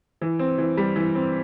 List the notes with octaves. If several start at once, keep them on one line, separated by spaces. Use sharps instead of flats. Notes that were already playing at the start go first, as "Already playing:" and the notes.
E3
C4
E3
G3
E3
C4